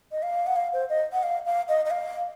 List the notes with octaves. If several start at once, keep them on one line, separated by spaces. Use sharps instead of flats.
D#5
F5
F#5
F5
C5
D#5
F#5
F5
F5
D#5
D#5
F5